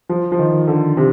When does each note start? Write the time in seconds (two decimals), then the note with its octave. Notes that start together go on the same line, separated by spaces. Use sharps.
0.09 F3
0.32 F3
0.39 D#3
0.67 D3
0.97 C3